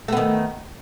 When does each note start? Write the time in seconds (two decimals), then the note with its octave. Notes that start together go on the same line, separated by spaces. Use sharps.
0.08 A3
0.12 B3
0.17 D#3